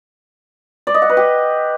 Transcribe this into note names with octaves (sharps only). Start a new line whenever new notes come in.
D5
D#5
F#5
B4
G4